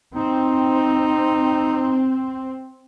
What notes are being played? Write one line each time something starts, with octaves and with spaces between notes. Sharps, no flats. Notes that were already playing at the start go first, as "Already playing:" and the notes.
C4 D#4